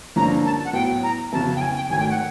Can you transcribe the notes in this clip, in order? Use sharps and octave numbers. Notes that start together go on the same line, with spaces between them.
G2 D3 F3 A#3 C#4 A#5
A5
F#5
A2 F#3 B3 G5
A#5
F2 C#3 F#3 B3 E4 A5
G5
G#5
G5
G#1 G#2 D#3 F#3 A3 G#5
G5
F#5